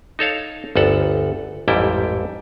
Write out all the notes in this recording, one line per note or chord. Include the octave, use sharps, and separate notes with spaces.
D#4 A4 C#5 F5
G1 D2 A4 F#5
A1 F2 G#2 G3 E4 G5